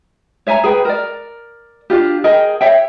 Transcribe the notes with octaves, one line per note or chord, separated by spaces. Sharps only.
C#5 E5 G#5 A#5
G#4 B4 G5
A#4 D5
D4 F4 G4
G#4 A#4 D#5 G5
C#5 E5 G5